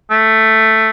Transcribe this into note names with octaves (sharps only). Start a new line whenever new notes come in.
A3